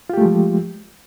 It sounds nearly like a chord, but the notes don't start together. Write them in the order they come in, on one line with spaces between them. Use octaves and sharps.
F4 G4 A3 G#3 F3